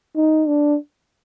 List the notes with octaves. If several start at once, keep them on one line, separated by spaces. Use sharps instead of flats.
D#4
D4